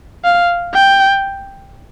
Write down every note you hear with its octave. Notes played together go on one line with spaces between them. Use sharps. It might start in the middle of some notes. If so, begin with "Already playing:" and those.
F5
G5